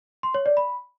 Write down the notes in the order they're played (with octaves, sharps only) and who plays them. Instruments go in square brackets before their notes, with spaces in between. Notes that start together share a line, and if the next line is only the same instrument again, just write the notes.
[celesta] C6
C#5
D5
B5